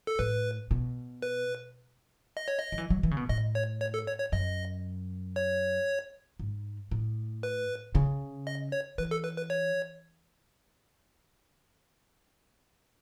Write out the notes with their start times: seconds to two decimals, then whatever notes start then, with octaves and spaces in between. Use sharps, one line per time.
0.07 A4
0.19 A2 B4
0.71 B2
1.22 B4
2.37 D#5
2.48 C#5
2.59 D#5
2.72 F#3
2.78 E3
2.90 F#3
3.03 E3
3.11 C#3
3.17 B2
3.29 A2 D#5
3.55 C#5
3.81 C#5
3.94 A4
4.07 C#5
4.20 C#5
4.32 F#2 D#5
5.36 C#5
6.39 G#2
6.91 A2
7.43 B4
7.95 C#3
8.47 D#5
8.72 C#5
8.98 E3 B4
9.11 A4
9.24 B4
9.37 B4
9.50 C#5